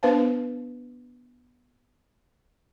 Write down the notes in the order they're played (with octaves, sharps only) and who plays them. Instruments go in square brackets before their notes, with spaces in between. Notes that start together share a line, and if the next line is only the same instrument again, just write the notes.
[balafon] B3 D4 B4 C5 F5 A5